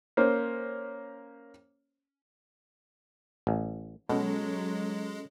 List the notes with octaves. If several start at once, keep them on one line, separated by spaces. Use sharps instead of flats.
A#3 C#4 C5
A1
B2 F#3 G#3 C#4 A4